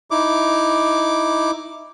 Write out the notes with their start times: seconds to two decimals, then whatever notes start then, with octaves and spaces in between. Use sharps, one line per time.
0.11 D#4 E4 D6